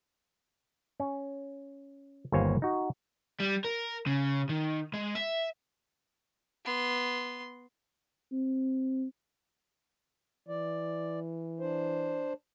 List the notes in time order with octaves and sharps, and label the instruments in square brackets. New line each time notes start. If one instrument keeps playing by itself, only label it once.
[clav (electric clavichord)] C#4
G1 D#2 A#3 C5 C#5 G#5
D#4 F#4
[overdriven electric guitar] G3
A#4
C#3
D#3
G#3
E5
[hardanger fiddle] B3 C6
[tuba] C4
[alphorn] E3 [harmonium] D5
[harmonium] D4 C5